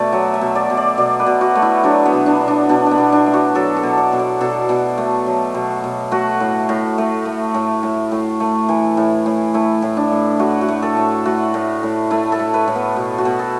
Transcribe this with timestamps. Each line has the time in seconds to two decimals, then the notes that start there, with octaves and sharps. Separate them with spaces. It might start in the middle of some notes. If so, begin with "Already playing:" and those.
Already playing: B2 A3 D5 E5
0.12 F#3
0.34 E5
0.41 B2
0.55 D5
0.70 B2
0.77 D5
0.98 B2 D5
1.20 B4
1.26 B2
1.41 F#4
1.55 A3
1.62 E4
1.83 F#3 D4
2.05 B3
2.13 B2
2.26 D4
2.41 B2
2.48 D4
2.69 B2 D4
2.86 B3 D4
2.98 B2
3.12 D4
3.26 A3
3.34 F#4
3.55 F#3 A4
3.76 A4
3.83 B2
3.98 D5
4.12 B2
4.19 D5
4.41 B2 A4
4.69 B2
4.98 A3
5.27 F#3
5.54 B2
5.84 B2
6.11 A3 F#4
6.40 A2
6.69 A2
6.98 A3
7.25 A3
7.54 A2
7.83 A2
8.12 A2
8.40 A3
8.69 E3
8.97 A2
9.26 A2
9.54 A3 E4
9.82 A2
9.97 D4
10.12 A2
10.39 A3 F#4
10.61 F#4
10.68 A3
10.82 A4
10.97 A2
11.25 A3 F#4
11.54 A2
11.83 A2
12.11 A3 E4
12.32 A4
12.39 A3
12.54 B4
12.68 A2
12.75 B3
12.96 B2
13.18 F#4
13.25 B2
13.39 A4